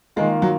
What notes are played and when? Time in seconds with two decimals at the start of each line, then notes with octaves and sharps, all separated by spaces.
0.16 D#3 G#3 A#3 F4
0.42 F#3